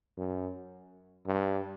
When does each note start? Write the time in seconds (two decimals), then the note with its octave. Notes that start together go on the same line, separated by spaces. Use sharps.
0.17 F#2
1.27 G2